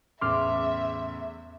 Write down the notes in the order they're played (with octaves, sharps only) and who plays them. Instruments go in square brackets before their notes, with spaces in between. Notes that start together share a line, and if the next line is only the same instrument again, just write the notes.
[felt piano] E2 A2 C#3 [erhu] E5 [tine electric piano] C6 D6 F6